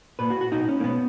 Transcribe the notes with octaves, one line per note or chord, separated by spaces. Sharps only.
A#2 B4
F#4
F#4
B2 D#4
C#4
A#3
B2 B3